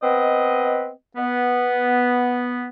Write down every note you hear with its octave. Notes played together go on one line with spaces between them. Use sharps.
B3 C4 B4 D#5
B3